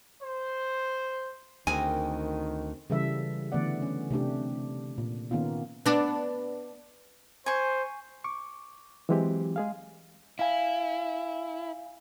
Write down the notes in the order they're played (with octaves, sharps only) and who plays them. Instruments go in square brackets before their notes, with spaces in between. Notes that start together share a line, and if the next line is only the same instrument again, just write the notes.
[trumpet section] C5
[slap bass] D2 [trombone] D#3 [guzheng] C4 G#4 A#4 [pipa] G#5
[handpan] C#3 E3 G3 A4 E5
D3 E3 A3 B3 D5 F#5
C#4
C3 A3 D4 G4
A#2
D#3 A#3 B3 C#4 F4
[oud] B3 D4
[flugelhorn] C5 [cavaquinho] G#5 C#6
[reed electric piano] C#6 D6
E3 F#3 G#3 C4 G4
G#3 G#4 F5
[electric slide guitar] E4 [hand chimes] F5 G#5